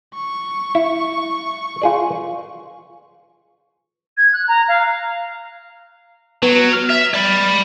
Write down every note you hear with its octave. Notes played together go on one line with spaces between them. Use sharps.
C#6
E4
F4 G#4 D5
G#6
F#6
A#5
F5
F#3 B3
F6
E5 F6
D5 B5